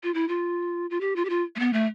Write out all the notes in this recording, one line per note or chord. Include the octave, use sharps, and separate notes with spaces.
F4
E4
F4
F4
G4
F4
G4
F4
A3
B3
A3